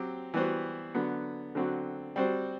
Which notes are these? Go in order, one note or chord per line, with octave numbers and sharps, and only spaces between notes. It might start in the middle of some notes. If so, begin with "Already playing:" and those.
Already playing: F#3 C4 G4
E3 G3 B3 F#4 C5
D3 F#3 B3
D3 F#3 C4 F#4
G3 C4 F#4 C5